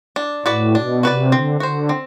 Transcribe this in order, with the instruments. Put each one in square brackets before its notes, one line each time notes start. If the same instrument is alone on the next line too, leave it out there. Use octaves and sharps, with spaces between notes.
[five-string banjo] D4
[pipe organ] A2 [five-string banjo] F#4 B4 D5
[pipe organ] B2 [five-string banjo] D4
[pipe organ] C3 [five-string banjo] F#4 B4 D5
[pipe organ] D3 [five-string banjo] C4
[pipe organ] D3 [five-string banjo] F#4 C5
[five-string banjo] C4